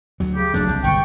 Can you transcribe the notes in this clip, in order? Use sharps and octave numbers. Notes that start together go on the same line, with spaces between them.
D2 F#3
C#3 G4
F#1 F#3 A3 D4
C2
G1 D#2 G5 C#6